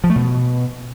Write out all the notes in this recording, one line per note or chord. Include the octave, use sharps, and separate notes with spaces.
F3
A3
B2